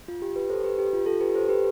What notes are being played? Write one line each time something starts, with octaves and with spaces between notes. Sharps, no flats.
F4
G4
G4 B4
A4 C5
G4 B4
G4
F4
F4 A4
G4 B4
A4 C5
G4 B4